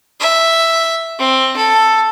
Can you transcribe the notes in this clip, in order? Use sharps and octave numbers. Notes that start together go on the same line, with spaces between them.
E5
C4
A4